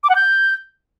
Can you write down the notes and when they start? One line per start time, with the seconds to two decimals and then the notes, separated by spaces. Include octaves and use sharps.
0.04 D6
0.10 F#5
0.15 G6